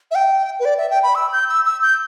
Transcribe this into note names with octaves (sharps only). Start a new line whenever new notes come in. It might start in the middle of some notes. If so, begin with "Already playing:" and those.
E5
G5
B4
D5
E5
G5
B5
E6
G6
E6
E6
G6